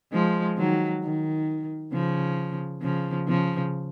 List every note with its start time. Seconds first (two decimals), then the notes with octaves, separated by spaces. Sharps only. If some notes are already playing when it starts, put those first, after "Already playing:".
0.12 F3 G#3
0.58 D#3 F#3
1.03 D#3
1.92 C#3 F3
2.82 C#3 F3
3.28 C#3 F3